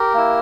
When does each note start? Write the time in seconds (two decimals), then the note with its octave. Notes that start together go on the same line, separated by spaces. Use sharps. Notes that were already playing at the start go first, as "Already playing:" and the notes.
Already playing: G4 A#4
0.14 A#3 E4